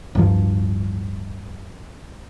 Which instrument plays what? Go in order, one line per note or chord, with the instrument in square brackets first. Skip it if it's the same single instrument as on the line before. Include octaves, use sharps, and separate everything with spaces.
[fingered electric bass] D1 G2 F3